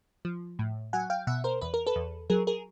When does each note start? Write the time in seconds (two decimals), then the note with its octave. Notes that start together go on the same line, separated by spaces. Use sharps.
0.25 F3
0.59 A2
0.93 F#3 F#5 G#5
1.10 F5 G5
1.27 B2 E5 F#5
1.44 A#4 C5
1.61 E2 B4
1.74 A#4
1.87 A4 B4
1.96 E2
2.30 F#3 G#4 A#4
2.47 G#4 A#4